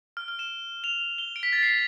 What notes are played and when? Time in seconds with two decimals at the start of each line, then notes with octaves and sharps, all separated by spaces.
0.17 F6
0.28 F6
0.39 E7
0.84 F7
1.18 G7
1.36 D7
1.43 B6
1.53 A6
1.63 C7